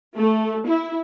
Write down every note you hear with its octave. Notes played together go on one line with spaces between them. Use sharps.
A3
E4